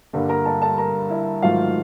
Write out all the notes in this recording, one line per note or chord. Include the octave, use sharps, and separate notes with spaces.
G2 D3 G3 A#3
A#4 A#5
A4 A5
A4 A5
A#4 A#5
E4 E5
G#2 D#3 F#3 A3 F4 F5